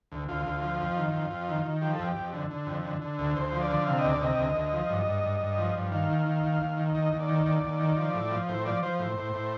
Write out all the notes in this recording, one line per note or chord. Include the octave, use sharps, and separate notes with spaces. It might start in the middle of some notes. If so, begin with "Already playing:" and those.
D2
D2 F4
D2
F3
F2
D#3
F2
F2
D#3
D#3
F3 G4
A4
F2
G4
F2
D3
D3
F2
D3
D3
D2
D2 C5
F3
D5
D3
C3 F5
D#5
D2
D5
C3 D#5
D2
D2
F3
G2
G2
G2
G2
F3
G2
D#3 F5
D#2
D#3
D#2
D#2
D#3
D#2 D#5
D#2
D5
D#3
D#2 D5
D#2
D#3
F3
A2
F3
A2 C5
F3 D5
F3 C5
A2
A2
A2